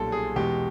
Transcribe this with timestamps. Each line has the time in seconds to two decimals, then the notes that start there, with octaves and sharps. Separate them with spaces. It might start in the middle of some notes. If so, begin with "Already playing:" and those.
Already playing: B1 A#2 G3 A4
0.12 G#4
0.36 E2 B2 G#3 G4